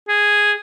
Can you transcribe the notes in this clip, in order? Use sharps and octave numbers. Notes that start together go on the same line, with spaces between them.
G#4